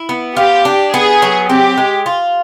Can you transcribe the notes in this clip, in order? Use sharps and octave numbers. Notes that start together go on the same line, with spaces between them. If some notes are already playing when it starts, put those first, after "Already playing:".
Already playing: E4
B3
F4 G4
D4
B3 G#4
F#3
C4 G4
G#3
F4